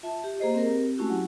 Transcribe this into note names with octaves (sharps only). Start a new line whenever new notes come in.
F4 E5 A5
G4
A#3 G#4 C5 D#5
C4 G4 A#4
G#3 A3 C#4 E4 F#4 G4
F#3